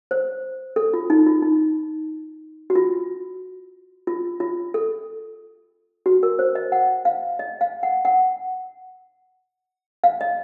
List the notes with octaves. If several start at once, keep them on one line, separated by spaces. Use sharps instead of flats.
C5
A4
F4
D#4
F4
D#4
F#4
F4
F4
F4
A4
F#4
A#4
C5
D#5
F#5
F5
D#5
F5
F#5
F#5
F5
D#5